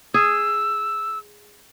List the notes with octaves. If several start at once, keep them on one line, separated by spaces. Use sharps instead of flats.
G#4 E6